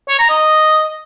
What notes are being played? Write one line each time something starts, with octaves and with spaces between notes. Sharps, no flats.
C#5
A#5
D#5